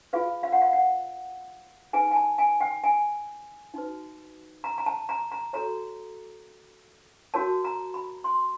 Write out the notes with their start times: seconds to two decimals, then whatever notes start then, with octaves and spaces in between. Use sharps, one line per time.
0.13 F4 G#4 B4 F5
0.43 F5
0.52 F#5
0.62 F5
0.73 F#5
1.93 D#4 G#4 B4 G#5
2.11 G#5
2.16 A5
2.38 G#5
2.61 G5
2.84 G#5
3.74 D#4 F#4 B4
4.64 A#5
4.78 A#5
4.86 A5
5.09 A#5
5.32 A#5
5.53 F#4 A4 C#5 A#5
7.34 F#4 A#4 C#5 A5
7.65 A#5
7.94 B5
8.24 C6